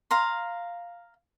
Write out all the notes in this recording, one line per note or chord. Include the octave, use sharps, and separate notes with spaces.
F5 A#5 C6